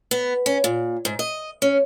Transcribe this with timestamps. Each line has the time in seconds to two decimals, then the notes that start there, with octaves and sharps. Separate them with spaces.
0.11 B3
0.46 C#4
0.64 A#2
1.05 G#2
1.19 D#5
1.62 C#4